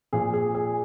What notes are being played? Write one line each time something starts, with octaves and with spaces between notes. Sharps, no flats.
A#2 F3 G#4
G#4
G#4